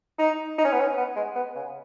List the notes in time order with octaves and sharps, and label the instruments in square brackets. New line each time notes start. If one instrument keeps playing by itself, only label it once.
[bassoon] D#4
D#4
C#4
B3
C#4
B3
G#3
B3
C#3